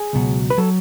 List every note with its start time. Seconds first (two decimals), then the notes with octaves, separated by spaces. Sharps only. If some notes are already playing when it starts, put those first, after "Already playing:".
Already playing: G#4
0.13 C#2 B2 F#3
0.50 B4
0.58 F#3 A4